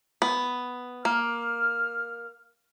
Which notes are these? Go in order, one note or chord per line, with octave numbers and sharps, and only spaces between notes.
B3
A#3 F6